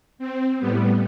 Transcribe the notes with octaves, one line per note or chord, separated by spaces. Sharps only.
C4
A2 G3 B3